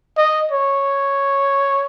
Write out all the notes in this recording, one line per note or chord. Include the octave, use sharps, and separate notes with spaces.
D#5
C#5